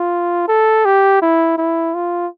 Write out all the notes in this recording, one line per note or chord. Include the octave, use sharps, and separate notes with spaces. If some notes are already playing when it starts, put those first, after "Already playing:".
Already playing: F4
A4
G4
E4
E4
F4